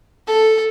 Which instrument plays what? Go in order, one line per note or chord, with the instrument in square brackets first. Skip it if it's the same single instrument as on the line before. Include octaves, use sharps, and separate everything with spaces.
[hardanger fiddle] A4